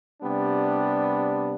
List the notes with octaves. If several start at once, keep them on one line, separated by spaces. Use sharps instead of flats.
C3 G3 B3 D4